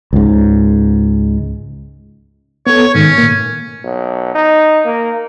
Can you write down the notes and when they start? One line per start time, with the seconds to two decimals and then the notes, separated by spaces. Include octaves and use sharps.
0.13 C#2 G#2
2.67 B3 A4 C#5
2.95 G#2 D#3 C#4
3.18 A#2 A#3
3.84 B1
4.35 D#4
4.85 A#3